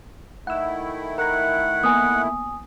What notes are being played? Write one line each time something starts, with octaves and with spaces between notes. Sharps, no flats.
D#3 A3 E4 F#5 E6
A#4 F#5 A#5
A#3 B3 G#5 D#6